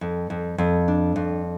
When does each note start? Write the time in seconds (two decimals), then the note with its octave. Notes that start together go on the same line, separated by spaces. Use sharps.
0.01 F2
0.30 F2
0.58 F2
0.88 D4
1.16 F2